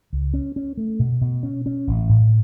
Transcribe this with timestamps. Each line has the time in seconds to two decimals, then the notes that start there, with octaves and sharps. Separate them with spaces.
0.13 C#2
0.34 C#4
0.56 C#4
0.78 A3
0.99 B2
1.21 B2
1.43 C#4
1.66 C#4
1.87 A1
2.09 A2